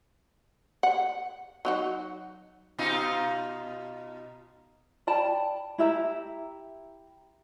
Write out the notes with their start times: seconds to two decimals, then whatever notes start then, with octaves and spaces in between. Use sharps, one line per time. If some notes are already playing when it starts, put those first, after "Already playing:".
0.83 F#5
1.65 F#3 D#4 F#4
2.78 B2 D#4 F4
5.07 D5 G5 A5 B5
5.78 E4 G4 E5 A#5